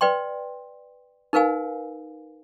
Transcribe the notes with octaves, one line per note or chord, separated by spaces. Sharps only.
B4 D5 G5 C6
D#4 A#4 B4 F5 G#5